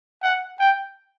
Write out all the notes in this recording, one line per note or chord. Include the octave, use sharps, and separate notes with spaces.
F#5
G5